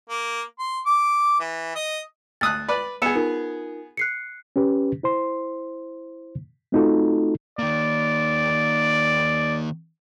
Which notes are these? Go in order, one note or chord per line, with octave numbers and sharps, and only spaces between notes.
A#3
C6
D6
E3
D#5
D2 D#6 F#6 A6
B4 D5
B3 G#4 E6 C#7 E7
D#4 F4 A#4
F#6 C7 C#7
C#4 G4 B4
E4 C5 C6
A3 C4 D#4 F4 F#4 A4
D#3 A#3 D5